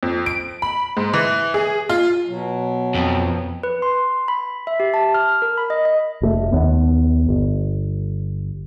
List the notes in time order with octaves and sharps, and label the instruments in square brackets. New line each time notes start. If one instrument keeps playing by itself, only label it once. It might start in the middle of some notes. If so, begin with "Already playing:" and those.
[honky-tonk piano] F2
D7
B5
G#2
E3
G#4
F4
[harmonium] B2 F#3
[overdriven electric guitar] F2
[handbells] B4
C6
B5
E5
G4
A5
F6
A#4
B5
D#5
D#5
[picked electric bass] F1 A#2 A3
D#2 B3
G1